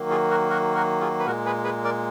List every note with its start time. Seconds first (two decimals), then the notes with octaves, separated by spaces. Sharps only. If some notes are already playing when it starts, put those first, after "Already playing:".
Already playing: D#3 F#3 A#3
0.10 F4 G#4
0.30 F#4 A#4
0.50 F#4 A#4
0.75 F#4 A#4
1.01 F4 G#4
1.20 B4
1.26 A#2 G#3 F#4 A#4
1.46 G#4 B4
1.64 G#4 B4
1.85 A#4 D5